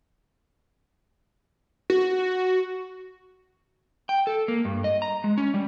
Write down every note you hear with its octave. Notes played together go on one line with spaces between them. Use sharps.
F#4
G5
A4
A#3
G2
D#5
A#5
G#3
C#4
G3